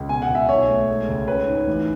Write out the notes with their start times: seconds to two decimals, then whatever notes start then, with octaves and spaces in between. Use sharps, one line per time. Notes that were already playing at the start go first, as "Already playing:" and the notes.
Already playing: C#2
0.09 B2 G#5
0.22 F#5
0.28 C#2
0.35 E5
0.49 B1 C#5
0.68 A3
0.89 G#3
1.09 C#2
1.27 C#4 B4
1.47 G#2
1.67 A1